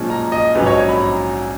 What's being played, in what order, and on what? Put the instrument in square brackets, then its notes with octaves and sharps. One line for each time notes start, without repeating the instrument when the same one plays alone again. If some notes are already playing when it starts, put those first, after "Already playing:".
Already playing: [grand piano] B1 A#2 F3 G#3 C#4
A#5
D#5
A#1 G#2 F#3 C#4 B4
C#5
D#5
B5
A#5